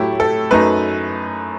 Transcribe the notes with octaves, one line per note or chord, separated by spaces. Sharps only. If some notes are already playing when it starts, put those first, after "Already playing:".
Already playing: A2 F#3 A3 E4 G4
A4
F#2 F#3 A3 D#4 B4